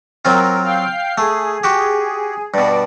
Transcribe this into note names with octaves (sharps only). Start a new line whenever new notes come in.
F#3 C4 F4 A#4
F5 G5 C7
A3 G#4
F#4 G4
G2 B2 D5